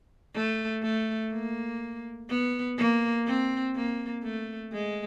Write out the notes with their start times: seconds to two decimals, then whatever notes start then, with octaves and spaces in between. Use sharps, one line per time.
0.35 A3
0.83 A3
1.32 A#3
2.29 B3
2.77 A#3
3.27 C4
3.76 A#3
4.23 A3
4.73 G#3